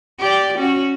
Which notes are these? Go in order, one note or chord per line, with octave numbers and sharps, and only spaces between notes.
G4 D5
C#4 F#4